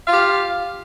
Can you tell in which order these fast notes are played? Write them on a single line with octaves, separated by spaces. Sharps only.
F5 F4 G4